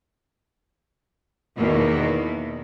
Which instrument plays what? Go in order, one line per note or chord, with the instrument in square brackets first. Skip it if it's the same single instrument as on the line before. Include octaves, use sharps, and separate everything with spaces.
[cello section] E2 B2 D#3 A#3 B3